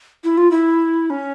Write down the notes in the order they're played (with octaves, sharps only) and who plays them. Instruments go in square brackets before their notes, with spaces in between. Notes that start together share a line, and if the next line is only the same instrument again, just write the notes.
[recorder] E4
F4
E4
C#4